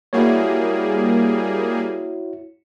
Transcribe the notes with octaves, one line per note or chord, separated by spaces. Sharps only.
G3 A#3 E4 F#4 G#4 C#5